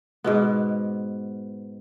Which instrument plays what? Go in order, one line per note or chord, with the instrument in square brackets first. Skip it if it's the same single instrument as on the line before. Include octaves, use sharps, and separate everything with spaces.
[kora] G#2 B2 B3